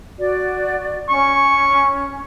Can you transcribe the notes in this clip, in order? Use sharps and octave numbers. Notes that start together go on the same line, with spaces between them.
F#4 D5
C#4 C#6